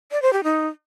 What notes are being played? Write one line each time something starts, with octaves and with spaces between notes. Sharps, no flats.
D5
C5
G4
D#4